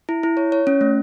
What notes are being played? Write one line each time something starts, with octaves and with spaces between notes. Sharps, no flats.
E4
E4
C#5
C#5
C#4
A3